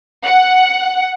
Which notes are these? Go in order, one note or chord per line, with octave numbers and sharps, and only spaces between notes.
F#5